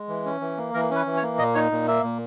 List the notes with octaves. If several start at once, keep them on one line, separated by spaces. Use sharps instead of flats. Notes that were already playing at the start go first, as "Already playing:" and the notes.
Already playing: G#3
E3
C#4
E3
A#3
E3 A#4
C#4 B4
E3
C#5
A#3
A#2 D#5
D#4 C#5
A#2
A#3 E5
A#2